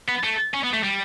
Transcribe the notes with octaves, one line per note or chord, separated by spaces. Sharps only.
B3
A3
C#4
B3
A3
G3